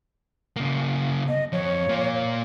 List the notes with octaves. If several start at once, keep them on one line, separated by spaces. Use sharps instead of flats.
C#3 A#3
D#5
F2 C#5
A#3 F4